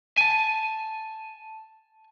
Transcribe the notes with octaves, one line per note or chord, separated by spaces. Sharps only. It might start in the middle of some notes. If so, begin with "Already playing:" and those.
G#5 A5